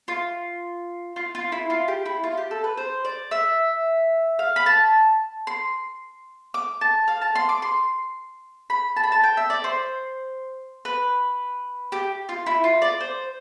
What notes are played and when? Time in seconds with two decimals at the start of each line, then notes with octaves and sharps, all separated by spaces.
0.08 F4
1.16 F4
1.35 F4
1.52 E4
1.70 F4
1.88 G4
2.06 E4
2.24 F4
2.37 G4
2.51 A4
2.64 B4
2.77 C5
3.05 D5
3.31 E5
4.39 F5
4.56 B5
4.66 A5
5.47 C6
6.54 D6
6.81 A5
7.08 F5
7.21 A5
7.35 C6
7.49 D6
7.62 C6
8.70 B5
8.96 A5
9.04 B5
9.12 A5
9.23 G5
9.37 E5
9.50 D5
9.64 C5
10.85 B4
11.92 G4
12.29 F4
12.46 E4
12.64 F4
12.82 D5
13.01 C5